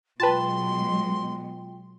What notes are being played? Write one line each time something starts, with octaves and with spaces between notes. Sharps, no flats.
B2 F#3 G#3 F4 B4 G5 A5 C6